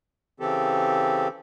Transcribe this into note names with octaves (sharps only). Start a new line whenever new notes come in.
C#3 E3 C4 G4 A4